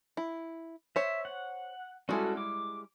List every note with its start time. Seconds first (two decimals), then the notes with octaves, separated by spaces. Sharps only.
0.17 E4
0.96 C5 C#5 E5
1.25 F#5
2.09 G3 G#3 C#4 E4 F#4 A4
2.37 D6